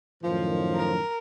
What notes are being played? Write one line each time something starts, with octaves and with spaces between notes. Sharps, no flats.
F#2 A2 D#3 F3
A#4